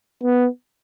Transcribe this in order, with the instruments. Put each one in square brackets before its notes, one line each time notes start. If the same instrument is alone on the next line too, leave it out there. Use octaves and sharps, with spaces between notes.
[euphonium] B3